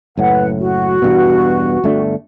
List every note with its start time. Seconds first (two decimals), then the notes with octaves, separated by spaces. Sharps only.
0.17 F#1 A2 B4 F#5
0.59 F#4
1.02 E2 G2 B2
1.84 G1 A3 D4